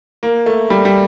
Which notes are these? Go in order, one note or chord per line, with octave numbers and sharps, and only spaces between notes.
A#3
A3
G3
G3